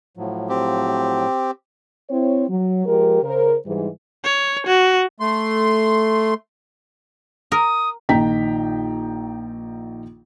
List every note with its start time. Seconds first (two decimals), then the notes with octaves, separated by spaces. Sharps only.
0.17 A2 F3 F#3
0.49 C4 G4
2.10 C4 E4 C#5
2.48 F#3
2.85 F3 G#3 G4 A#4
3.23 C#3 A#4 C5
3.65 G#2 E3 G3
4.24 C#5
4.67 F#4
5.20 A3 C6
7.52 A#4 D#6
8.09 A#1 D#3 D#4 G5 A#5 B6